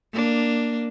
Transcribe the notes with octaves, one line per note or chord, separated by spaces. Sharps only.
A#3 D4